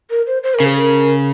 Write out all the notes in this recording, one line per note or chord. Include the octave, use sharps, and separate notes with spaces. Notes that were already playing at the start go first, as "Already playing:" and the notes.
A#4
C5
C5
A#4
C#3
G#4
A#4